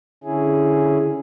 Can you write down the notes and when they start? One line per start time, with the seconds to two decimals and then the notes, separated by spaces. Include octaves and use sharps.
0.24 D3 C#4 E4 G#4